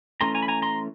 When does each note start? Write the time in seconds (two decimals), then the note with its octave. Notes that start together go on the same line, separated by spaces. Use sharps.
0.21 E3 A3 C#4 A#5 C6
0.35 G#5 A#5
0.42 B5
0.48 G#5 A#5
0.62 A#5 C6